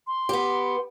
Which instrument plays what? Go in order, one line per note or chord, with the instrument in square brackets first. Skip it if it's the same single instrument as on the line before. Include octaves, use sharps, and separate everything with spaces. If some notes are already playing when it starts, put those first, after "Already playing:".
[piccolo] C6
[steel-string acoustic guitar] B3 G4